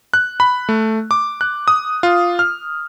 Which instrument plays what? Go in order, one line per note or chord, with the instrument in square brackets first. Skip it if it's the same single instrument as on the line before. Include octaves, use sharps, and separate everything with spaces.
[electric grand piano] F#6
B5
A3
D6
F#6
D#6
F4
F6